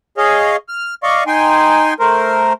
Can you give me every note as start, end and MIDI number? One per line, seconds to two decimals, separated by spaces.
0.17 0.56 68
0.17 0.56 73
0.17 0.56 75
0.17 0.56 77
0.69 0.94 89
1.03 1.24 74
1.03 1.24 75
1.03 1.24 77
1.03 1.24 85
1.27 1.94 63
1.27 1.94 79
1.27 1.94 80
1.27 1.94 84
2.00 2.53 57
2.00 2.53 70
2.00 2.53 72